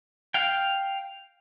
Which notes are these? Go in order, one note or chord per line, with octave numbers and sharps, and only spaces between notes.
F5 G5